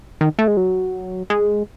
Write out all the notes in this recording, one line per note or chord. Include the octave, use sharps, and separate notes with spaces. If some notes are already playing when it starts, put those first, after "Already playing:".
D#3
A3
G#3
F#3
G#3